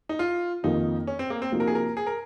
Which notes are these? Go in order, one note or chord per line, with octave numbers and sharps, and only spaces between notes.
D#4
F4
F2 D#3 A#3 D#4 F4
C#4
C4
A#3
C4
C3 F3 A#3 D#4 F#4
A#4
G#4
A#4
G#4
A#4